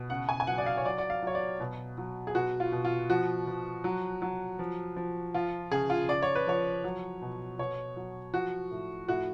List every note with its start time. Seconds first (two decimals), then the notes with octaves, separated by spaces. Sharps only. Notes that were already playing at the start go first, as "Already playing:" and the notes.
Already playing: B2
0.10 C#3 F#5
0.29 G#5
0.40 G#5
0.47 F#3 F#5
0.58 D5
0.66 F5
0.77 C#5
0.85 F#3 D5
0.98 D5
1.10 F5
1.23 F#3 C#5
1.35 D5
1.60 B2
1.98 F#3
2.27 G#4
2.35 B2 F#4
2.60 F4
2.72 B2
2.85 F4
3.10 F3 F#4
3.47 F3
3.84 F#3
4.22 F#3
4.59 F3
4.96 F3
5.34 F3 F4
5.71 C#3 G#4
5.90 F4
6.09 C#3 D5
6.23 C#5
6.35 B4
6.47 F3 C#5
6.84 F#3
7.22 B2
7.59 B2 C#5
7.96 F#3
8.33 F3 F#4
8.71 A2
9.08 A2 F#4